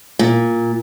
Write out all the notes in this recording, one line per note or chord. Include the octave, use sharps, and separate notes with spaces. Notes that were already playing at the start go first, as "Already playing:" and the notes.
A#2